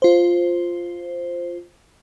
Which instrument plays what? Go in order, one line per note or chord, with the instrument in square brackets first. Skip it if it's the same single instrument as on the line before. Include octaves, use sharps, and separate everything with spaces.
[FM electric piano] F4 C5